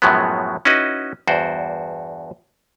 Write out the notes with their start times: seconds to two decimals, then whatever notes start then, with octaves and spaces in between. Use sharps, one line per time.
0.02 F#2 A2 F3 F#3 G#3 B3
0.65 C#4 D#4 E4 F#4 B4 D#5
1.27 E2 G2 F#4 C5 D5